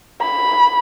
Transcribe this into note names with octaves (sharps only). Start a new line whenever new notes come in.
B5